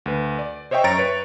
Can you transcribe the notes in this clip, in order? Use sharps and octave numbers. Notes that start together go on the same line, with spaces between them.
D2 B4
D5
C5 C#5 D#5 E5 G5 C#6
F#2 C#5 A#5 C#6 A6 D7
B4 C#5